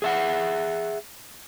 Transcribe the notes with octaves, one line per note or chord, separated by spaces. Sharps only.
G#4 E5 F#5